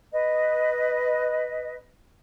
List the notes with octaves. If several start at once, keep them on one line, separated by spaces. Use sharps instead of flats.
B4 D#5